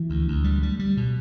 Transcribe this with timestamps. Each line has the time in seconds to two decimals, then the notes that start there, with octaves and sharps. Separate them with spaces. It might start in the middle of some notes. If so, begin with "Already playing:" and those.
Already playing: E3
0.10 D2
0.28 D2
0.44 G3
0.63 G3
0.79 G3
0.97 B2